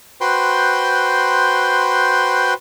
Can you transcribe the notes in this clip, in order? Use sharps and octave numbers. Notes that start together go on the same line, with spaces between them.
F#4 B4 C5 G5 C6